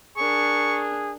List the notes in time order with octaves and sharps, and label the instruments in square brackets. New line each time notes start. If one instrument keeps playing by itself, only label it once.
[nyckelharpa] D4 A#4 [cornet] G#4 [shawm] C#6